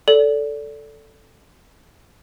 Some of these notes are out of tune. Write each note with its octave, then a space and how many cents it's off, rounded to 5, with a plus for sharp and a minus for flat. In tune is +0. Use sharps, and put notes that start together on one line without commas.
A4 +0 D5 -25